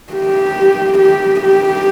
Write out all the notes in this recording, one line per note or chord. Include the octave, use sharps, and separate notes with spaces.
G4
G4
G4